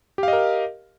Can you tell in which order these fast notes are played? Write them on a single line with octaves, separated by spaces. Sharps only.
G4 F5 D#5 A#4